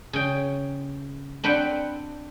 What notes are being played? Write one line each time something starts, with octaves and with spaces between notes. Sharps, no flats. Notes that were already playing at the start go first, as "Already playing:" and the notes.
C#3 G5
C4 D4 B4 F#5 G5